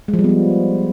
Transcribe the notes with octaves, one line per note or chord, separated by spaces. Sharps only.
G#3
F3
G3
B3
F3